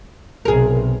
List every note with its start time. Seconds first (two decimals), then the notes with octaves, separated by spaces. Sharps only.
0.45 B1 C3 G#4 A#4